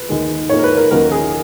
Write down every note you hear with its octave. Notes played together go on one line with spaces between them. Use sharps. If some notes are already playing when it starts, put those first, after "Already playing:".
Already playing: B4
D#2 D#3 G#3
G#2 D#3 A#3 C#5
A#4
B4
A#4
D#2 C#3 F#3 A#3 A#4
G#4